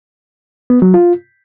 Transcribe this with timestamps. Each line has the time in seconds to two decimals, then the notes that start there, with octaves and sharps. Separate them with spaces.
0.70 B3
0.82 F#3
0.94 F4